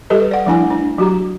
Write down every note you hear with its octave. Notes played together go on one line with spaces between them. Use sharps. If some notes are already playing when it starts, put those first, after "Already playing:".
G3 G4 A4 B4 D#5
D5 F#5
F3 A3 D4 E4 G#5
D4
F#3 F#4 G4 A#5